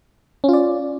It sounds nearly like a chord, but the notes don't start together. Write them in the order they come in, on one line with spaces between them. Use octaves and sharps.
C#4 F4 D5